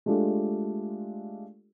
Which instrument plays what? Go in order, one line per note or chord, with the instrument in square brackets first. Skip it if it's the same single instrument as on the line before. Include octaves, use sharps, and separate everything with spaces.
[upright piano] G#3 A3 D4 F4 G4 A4